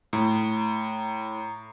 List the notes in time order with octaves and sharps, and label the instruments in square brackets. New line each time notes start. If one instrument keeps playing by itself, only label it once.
[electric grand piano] A2 [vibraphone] A#5